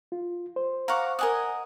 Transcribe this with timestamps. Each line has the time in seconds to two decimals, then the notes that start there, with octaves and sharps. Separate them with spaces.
0.12 F4
0.56 C5
0.88 F5 F#5 A#5 C#6 D6
1.19 A#4 D#5 F#5 G#5 D#6